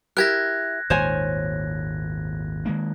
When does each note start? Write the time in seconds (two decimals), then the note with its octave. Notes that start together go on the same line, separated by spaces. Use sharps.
0.17 E4 G4 A#4 F#6 G#6 A#6
0.90 G#1 D#2 A#2 C5 C#5 G#5
2.65 D#3 G#3 A#3